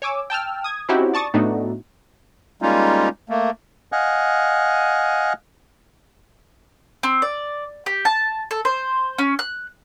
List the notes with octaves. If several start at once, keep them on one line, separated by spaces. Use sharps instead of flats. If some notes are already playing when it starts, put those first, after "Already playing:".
C#5 G#5 D6 E6
G5 A5 E6 F6
D#6 G#6
C4 C#4 D#4 E4 F#4 G4
D5 A5 C#6 D#6 A6
A2 A3 B3 D4 D#4 F#4
G3 G#3 A#3 C#4 D#4 F4
A3 A#3
D#5 F5 F#5 G#5
C4
D5
G4
A5
A4
C5
C#4
F#6